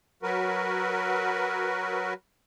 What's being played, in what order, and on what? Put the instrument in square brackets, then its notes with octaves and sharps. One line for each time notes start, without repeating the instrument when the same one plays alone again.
[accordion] F#3 F#4 A#4 B4